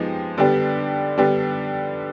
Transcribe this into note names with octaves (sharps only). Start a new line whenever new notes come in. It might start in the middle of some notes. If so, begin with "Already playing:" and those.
Already playing: F3 G#3 B3 D#4 G4
D3 G3 B3 D4 G4
D3 G3 B3 D4 G4